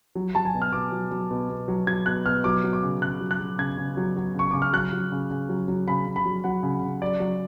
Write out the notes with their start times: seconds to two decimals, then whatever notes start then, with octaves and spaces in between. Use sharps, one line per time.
0.15 F#3
0.35 F#3 A5
0.45 G#5
0.54 B2
0.62 F6
0.73 B2 D6
0.92 F#3
1.11 F#3
1.31 B2
1.50 B2
1.68 F#3
1.87 F#3 G#6
2.06 B2 F#6
2.26 B2 F6
2.44 F#3 D6
2.63 F#3
2.73 D6
2.83 C#3
3.01 C#3 F#6
3.21 F#3
3.31 F#6
3.40 F#3
3.59 C#3 G#6
3.78 C#3
3.97 F#3
4.17 F#3
4.35 C#3 C#6
4.51 C#3 D6
4.62 F6
4.73 F#3 F#6
4.93 F#3
5.12 C#3
5.30 C#3
5.49 F#3
5.68 F#3
5.88 C#3 B5
6.07 C#3
6.16 B5
6.26 F#3
6.44 F#3 F#5
6.63 C#3
6.82 C#3
7.02 F#3 D5
7.20 F#3